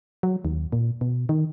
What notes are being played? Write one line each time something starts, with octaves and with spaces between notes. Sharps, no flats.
F#3
D#2
A#2
B2
D#3